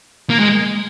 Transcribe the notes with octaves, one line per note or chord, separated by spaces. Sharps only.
A#3
G#3